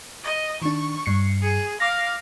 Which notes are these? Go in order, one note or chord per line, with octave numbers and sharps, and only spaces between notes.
D#5
D#3 D4 C#6
G2 C7 C#7
G#4
F5 D6 A#6